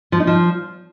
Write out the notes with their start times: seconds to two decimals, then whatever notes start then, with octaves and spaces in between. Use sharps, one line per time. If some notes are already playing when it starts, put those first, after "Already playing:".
0.12 F3
0.20 D#4
0.27 F3